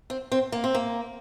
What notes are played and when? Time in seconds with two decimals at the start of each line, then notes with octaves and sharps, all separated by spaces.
0.10 C4
0.32 C4
0.52 A#3
0.64 C4
0.75 A#3